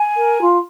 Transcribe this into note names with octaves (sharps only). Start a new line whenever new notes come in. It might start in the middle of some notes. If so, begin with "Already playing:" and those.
Already playing: G#5
A#4
F4